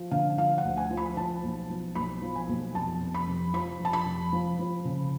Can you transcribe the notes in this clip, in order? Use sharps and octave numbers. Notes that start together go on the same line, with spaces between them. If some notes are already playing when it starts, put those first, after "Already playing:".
Already playing: F3
D3 F5
F3 F5
F#5
D2
G#5
F3
B5
F3 A5
B1
F3
B1 B5
F3
G#5
B1
F1 A5
F1
B5
F1
F3 B5
F1 A5
B5
F1
F3
F3
C#3